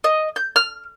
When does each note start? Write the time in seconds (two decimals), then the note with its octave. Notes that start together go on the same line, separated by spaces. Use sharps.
0.04 D#5
0.36 G6
0.56 F6